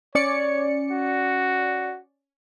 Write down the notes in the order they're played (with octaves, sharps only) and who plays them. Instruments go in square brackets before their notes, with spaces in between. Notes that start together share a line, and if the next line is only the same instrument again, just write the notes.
[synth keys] C#4 D5 C#7 [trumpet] C#5
[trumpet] F#4